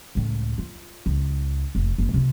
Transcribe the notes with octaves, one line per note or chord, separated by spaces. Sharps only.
C#2 A2
F4
C#2
F1
F#1
C3 F4